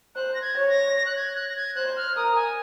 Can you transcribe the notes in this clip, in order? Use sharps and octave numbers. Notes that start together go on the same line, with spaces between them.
C5 F#6
A#6
G#6
C#5
A#6
A#6
F#6
G#6
F#6
A#6
G#6
C5 F#6
F6
A#4 D#6
G#5